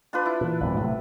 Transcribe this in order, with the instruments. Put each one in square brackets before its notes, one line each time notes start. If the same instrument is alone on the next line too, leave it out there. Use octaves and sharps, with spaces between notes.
[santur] D4 F4 B4
E4
[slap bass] A#2 E3
G#1 F2 B2
A2 C3 F#3